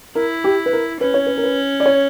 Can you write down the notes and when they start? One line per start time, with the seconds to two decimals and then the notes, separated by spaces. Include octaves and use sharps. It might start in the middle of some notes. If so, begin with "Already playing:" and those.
0.15 E4 A#4
0.44 G4
0.66 B4
0.73 A#4
1.01 C#4 B4
1.14 C#5
1.26 B4
1.38 A#4
1.43 B4
1.80 D5
1.86 C#5